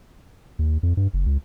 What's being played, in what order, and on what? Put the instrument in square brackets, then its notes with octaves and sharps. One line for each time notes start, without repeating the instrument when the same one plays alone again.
[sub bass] D#2
F2
G2
F#1
C#2